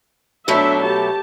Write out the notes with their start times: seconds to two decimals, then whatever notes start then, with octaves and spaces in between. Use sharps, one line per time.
0.48 B2 F#3 A3 D4 E5
0.85 G4 A5